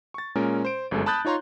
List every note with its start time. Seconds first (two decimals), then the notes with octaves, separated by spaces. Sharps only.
0.14 C#6 A6
0.35 A#2 G#3 C#4 A#4
0.65 C5 D7
0.91 G1 F#2 G#3 A4 G#5
1.06 A5 B5 D#6 F#6 G6 A6
1.25 D#4 F4 C#5 A#5 C6